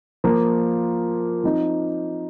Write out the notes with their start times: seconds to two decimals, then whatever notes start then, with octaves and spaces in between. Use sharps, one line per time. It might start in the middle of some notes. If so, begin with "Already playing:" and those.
0.24 F3 A#3 F4
1.44 F3 C4 D#4